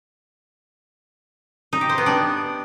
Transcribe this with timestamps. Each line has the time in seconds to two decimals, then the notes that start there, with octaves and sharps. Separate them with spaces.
1.73 D#4
1.81 G4
1.89 C5
1.98 B3
2.06 D4